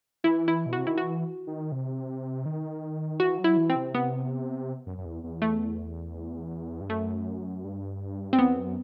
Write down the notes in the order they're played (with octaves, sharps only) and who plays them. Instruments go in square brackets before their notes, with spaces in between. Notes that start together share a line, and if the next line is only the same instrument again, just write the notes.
[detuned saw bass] E3 [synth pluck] E4
[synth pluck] E4
[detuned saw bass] B2
[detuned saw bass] C3 [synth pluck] F#4
[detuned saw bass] D#3 [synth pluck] E4
[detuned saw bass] E3 [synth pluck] F#4
[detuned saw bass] D#3
C3
D#3
[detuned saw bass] E3 [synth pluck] F#4
[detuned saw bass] F#3
[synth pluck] E4
[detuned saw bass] E3
[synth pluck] C4
[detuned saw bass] C3
[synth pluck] B3
[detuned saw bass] F#2
F#2
E2
E2
[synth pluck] A3
[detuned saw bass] G2
[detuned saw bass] F#2 [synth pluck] A3
[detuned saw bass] G2
[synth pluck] C4
[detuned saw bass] E2 [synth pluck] B3
[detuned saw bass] F#2